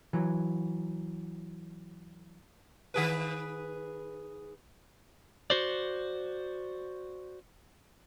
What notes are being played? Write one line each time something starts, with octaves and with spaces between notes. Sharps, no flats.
E3 F#3
D#3 G#4 B4
F#4 C5 D5